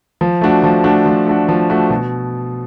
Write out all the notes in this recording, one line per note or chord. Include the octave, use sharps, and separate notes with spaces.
F3
A3 D4 F#4
F3
A3 D4 F#4
F3
A3 D4 F#4
F3
A3 D4 F#4
B2